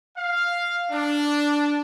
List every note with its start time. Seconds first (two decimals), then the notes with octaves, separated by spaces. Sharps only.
0.17 F5
0.91 D4